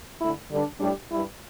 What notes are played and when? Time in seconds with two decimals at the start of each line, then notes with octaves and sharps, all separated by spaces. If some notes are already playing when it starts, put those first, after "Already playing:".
0.19 D3 A3 E4
0.50 G2 D3 G3 D4
0.79 A2 G3 D4 G4
1.09 G2 G3 E4